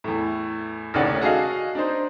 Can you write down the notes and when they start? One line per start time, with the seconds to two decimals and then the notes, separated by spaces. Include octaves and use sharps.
0.04 E2 A2
0.94 A1 D#2 C#3 C#4 D5 F#5
1.22 F#4 G#4 A4 D#5 F5
1.75 D4 D#4 C5